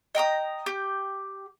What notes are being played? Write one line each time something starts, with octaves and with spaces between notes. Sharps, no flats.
D#5 G5 A#5 D#6
G4 G5